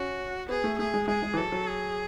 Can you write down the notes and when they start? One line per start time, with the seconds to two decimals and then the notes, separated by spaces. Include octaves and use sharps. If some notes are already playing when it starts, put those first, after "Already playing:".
Already playing: C#4 F#4
0.49 B3 G#4
0.64 A3
0.79 A3 G#4
0.94 G#3
1.08 G#3 G#4
1.23 G#3
1.34 E3
1.37 F#3 A4
1.52 F#3
1.67 G#4